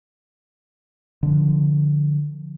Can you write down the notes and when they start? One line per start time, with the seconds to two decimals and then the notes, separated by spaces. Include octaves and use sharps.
1.23 D3 F3